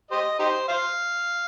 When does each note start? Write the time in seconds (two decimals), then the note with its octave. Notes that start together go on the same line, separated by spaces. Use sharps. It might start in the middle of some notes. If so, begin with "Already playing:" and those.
0.11 G4 C5 D#5
0.39 D#4 G4 C5
0.68 C5 F5